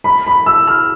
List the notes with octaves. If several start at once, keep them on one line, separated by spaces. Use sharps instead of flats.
B5
B5
E6
F6